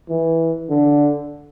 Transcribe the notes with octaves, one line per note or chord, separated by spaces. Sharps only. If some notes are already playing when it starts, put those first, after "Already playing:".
E3
D3